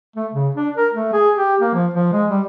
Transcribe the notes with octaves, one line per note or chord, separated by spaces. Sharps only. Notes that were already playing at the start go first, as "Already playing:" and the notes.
A3
C#3
D4
A#4
A3
G#4
G4
A#3
F3
F3
G#3
G3